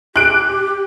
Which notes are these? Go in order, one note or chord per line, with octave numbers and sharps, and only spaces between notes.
G4 F#6 D7